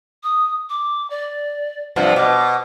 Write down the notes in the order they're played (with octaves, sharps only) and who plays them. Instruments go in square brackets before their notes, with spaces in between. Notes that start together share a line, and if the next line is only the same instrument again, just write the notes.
[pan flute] D#6
D6
D5
[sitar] G2 C3 F3 [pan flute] F#5
[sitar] B2 [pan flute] D6